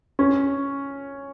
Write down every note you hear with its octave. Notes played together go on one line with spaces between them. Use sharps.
C#4